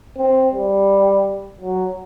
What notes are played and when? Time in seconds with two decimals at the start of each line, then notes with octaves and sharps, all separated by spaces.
0.18 C4
0.53 G3
1.61 F#3